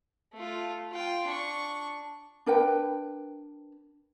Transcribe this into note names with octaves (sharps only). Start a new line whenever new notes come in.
A3 F4
F4 G5
D4 C#6
D4 A#4 B4 G5